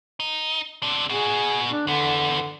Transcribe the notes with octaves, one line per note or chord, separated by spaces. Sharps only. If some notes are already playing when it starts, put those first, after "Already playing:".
D#4
C3 D4
B2 G#4 F#5
D4
E2 D3 B3